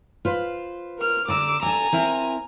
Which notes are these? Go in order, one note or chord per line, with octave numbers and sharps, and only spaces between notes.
F4 B4 C5
A#4 F6
D3 D5 A#5 D6 E6
D4 A4 G#5 A#5
C4 E4 A#4